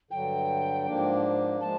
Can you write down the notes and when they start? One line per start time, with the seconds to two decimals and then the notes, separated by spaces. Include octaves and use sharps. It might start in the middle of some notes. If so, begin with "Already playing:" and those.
0.11 G2 D3 F#3 G5
0.85 G#2 F3 A#3 D4
1.61 F3 G#3 A5